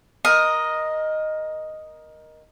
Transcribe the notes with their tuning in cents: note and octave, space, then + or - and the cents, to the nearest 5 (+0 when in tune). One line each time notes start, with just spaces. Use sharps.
A#4 +15 D#5 +0 D#6 +0